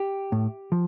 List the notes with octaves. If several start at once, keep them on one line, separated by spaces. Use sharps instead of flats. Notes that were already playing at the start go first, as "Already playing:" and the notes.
Already playing: G4
A2
F3